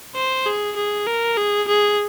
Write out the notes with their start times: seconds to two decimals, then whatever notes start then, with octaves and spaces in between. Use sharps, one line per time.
0.15 C5
0.46 G#4
0.76 G#4
1.07 A#4
1.37 G#4
1.68 G#4